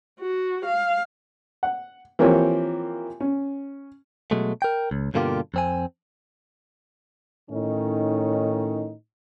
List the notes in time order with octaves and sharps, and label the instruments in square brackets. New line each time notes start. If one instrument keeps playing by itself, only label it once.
[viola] F#4
F5
[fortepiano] F#5
E3 F3 A#3 C4 G4 C#5
C#4
[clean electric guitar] B2 F#3 G#3 A3
A#4 G5
C#2
G2 B2 D3 A#3 F4 G4
F2 C4 G#5
[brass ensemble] A2 D#3 C#4 D#4